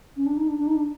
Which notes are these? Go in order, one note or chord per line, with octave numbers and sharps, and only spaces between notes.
C#4
D4
D#4
D4
D4
D#4
D4